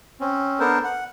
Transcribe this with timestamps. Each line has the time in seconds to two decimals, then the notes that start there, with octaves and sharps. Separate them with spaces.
0.20 C4 C#4
0.60 B3 D4 A4 A#4 C5
0.84 F#5